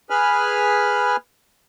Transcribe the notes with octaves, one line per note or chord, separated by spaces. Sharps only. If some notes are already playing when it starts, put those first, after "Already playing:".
G#4 B4 G#5 B5 F6